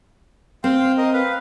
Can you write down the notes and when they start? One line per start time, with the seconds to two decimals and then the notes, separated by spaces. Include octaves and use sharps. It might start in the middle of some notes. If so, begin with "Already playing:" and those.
0.64 C4 F5 G5 C6
0.97 A#4 D#5
1.13 B4 F5